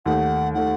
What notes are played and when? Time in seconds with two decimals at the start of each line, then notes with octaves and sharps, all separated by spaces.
0.06 D#2 D#3 A3 F#5
0.54 D#3 A3 F#5